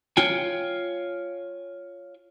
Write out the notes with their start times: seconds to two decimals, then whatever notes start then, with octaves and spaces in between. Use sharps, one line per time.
0.17 F4 C#5 G5 G#5